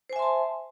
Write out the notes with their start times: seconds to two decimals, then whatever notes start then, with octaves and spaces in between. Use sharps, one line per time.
0.10 C5
0.13 G#5
0.16 E5
0.19 C6
0.22 A5